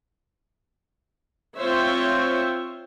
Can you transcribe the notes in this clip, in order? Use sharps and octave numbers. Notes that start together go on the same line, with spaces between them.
C4 F4 C5 C#5 E5